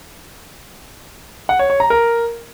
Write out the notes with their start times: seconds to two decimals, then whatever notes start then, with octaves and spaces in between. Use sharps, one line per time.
1.49 F#5
1.59 C#5
1.70 C#5
1.80 A#5
1.90 A#4